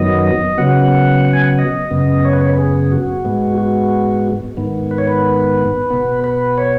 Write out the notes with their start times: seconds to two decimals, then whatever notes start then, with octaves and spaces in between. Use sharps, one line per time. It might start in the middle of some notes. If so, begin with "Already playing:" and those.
Already playing: F#2 D#3 F#3 B3 D#5
0.58 C#3 F#3 B3 F#5
1.25 F#5
1.33 G#5
1.41 F#5
1.59 D#5
1.91 F#2 C#3 B3
2.25 C#5
2.33 B4
2.41 C#5
2.49 B4
2.58 G#4
2.92 F#4
3.24 G#2 G#3 B3
3.58 F#4
4.57 G#2 D#3 B3
4.91 B4
4.98 C#5
5.07 B4
5.90 B2 B3
6.24 B4
6.58 C#5